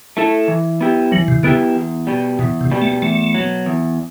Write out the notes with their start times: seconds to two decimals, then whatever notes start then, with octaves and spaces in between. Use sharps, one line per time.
0.17 A3 E4 A4
0.48 E3
0.81 B3 E4 G4
1.11 E3 F#3
1.28 C3
1.43 D3 B3 E4 G4
1.76 E2
2.07 B2 G3
2.39 E2 B2
2.61 C3
2.71 B2 G3
2.82 A3
3.02 E2 A3
3.35 B2 F#3
3.66 E2